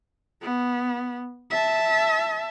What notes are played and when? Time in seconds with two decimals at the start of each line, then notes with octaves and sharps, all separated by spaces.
0.41 B3
1.50 E5 A5